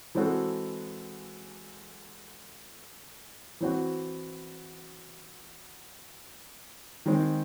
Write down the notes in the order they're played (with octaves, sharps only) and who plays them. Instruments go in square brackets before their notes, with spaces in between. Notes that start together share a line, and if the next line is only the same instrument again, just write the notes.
[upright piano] E3 G#3 C4 F#4 A4
E3 C4 F#4
D#3 G#3 C4